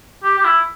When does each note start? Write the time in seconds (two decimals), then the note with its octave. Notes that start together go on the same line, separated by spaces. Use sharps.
0.24 G4
0.39 G4
0.45 E4